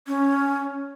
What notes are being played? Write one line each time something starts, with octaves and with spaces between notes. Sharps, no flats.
C#4